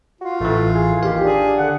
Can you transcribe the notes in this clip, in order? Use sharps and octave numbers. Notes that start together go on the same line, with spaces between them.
F4 F#4
A1 E3 A3
G#4
D#2 G4 F5
D4 G#4
D3 F#5